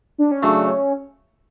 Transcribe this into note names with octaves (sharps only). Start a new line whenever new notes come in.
D4
C#4
C#3 F#3 A3 D4
C#4